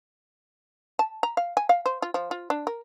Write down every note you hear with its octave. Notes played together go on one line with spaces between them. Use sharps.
A5
A#5
F5
G#5
F5
C5
F4
F3
F4
D4
A#4